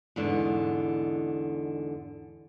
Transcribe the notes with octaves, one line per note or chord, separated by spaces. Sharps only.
E2 G#2 D3